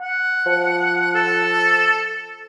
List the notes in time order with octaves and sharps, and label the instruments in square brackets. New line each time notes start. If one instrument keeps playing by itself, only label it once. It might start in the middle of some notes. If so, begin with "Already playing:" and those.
[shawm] F#5
[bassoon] F3
[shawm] A4